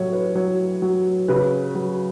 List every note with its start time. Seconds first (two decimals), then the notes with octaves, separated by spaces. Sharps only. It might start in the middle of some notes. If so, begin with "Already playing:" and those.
Already playing: A2 F#3 C#5
0.13 B4
0.35 F#3 C#5
0.82 F#3
1.28 C#3 B4
1.75 F#3